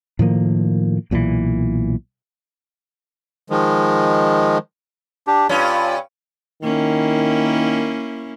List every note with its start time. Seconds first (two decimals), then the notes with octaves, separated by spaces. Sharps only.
0.19 A2 D#3 F3 A#3
1.11 B1 A#2 D3 E3
3.50 D#3 F3 G#3
5.27 D4 G4
5.49 G2 C#4 F4
6.62 D#3 A#3 C#4 E4